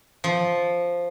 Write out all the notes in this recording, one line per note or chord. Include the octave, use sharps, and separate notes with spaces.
F3